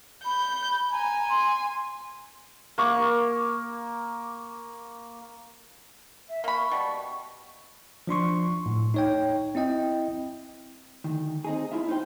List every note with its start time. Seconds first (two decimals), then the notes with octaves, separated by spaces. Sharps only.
0.24 B5 G6
0.92 G#5 A#5
1.29 C6
2.78 A#3 C#6 D6
6.29 E5
6.44 A#3 B5 C#6
6.71 B2 G3
8.07 F3 D4 C6 C#6
8.66 A2
8.94 D#4 C#5 G5
9.55 C4 E4 D#5 G5
11.04 D2 D#3
11.44 C4 D#4 G#4
11.72 E4 F4 E5
11.89 D#4 F4 C5 G5